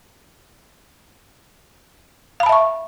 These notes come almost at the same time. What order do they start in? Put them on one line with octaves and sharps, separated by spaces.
F5 B5 A5 E5 C#6